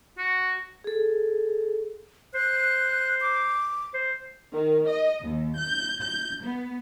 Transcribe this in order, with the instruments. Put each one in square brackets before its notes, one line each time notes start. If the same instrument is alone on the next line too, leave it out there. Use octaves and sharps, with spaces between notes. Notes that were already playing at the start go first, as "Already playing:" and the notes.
[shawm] F#4
[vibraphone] G#4 A4
[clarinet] C5 [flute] F#6
[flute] D6
[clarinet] C5
[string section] D#3
D#5
D#2
G6
G6
B3